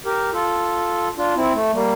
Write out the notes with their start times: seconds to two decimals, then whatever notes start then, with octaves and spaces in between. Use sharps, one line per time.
0.06 G4 A#4
0.33 F4 A4
1.17 D4 F4
1.36 C4 E4
1.55 A3
1.73 G3 A#3